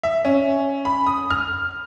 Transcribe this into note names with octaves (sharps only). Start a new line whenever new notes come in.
E5
C#4
B5
D#6
F6